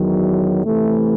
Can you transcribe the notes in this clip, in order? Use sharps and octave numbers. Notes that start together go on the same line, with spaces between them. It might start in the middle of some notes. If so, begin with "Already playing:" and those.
Already playing: E2 D#3 F#3
C3 E3 A3